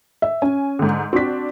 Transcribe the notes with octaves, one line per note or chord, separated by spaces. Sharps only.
E5
C#4 G#5
G#2 D3
C4 D4 F#4 B6